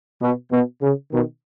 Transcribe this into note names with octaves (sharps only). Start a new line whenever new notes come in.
B2
B2
C#3
B2 D#3